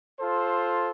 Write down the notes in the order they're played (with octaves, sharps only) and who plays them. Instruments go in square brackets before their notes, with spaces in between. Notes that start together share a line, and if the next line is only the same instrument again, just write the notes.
[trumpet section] F4 A4 C5